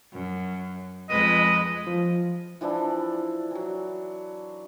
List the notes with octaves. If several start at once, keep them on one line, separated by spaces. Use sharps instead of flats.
F#2
F2 G#3 B4 D#5
F3
E3 F3 D4 E4
E3 F#3